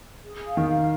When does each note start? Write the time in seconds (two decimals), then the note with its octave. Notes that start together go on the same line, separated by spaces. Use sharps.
0.24 G#4
0.46 F5
0.57 D#3
0.68 F5